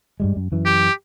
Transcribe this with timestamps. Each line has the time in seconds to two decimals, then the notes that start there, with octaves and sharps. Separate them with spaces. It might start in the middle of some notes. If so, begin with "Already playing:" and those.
0.20 G2 G3 G#3
0.36 F#2
0.52 F#2 E3
0.65 G4